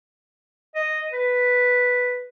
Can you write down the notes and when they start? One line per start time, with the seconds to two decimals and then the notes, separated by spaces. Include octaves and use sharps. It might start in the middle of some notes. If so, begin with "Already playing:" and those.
0.75 D#5
1.12 B4